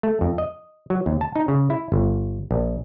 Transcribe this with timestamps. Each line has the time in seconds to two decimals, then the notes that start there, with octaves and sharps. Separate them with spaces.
0.03 A3
0.21 F2
0.38 D#5
0.90 F#3
1.06 D#2
1.21 A5
1.36 D#4
1.48 C#3
1.70 E4
1.92 G1
2.51 A#1